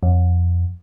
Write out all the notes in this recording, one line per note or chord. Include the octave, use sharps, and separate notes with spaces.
F2